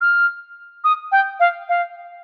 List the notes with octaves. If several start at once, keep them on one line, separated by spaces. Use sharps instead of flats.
F6
D#6
G5
F5
F5